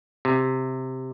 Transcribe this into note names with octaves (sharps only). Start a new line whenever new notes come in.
C3